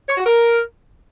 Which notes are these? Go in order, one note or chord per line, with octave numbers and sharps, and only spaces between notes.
C#5
F#4
A#4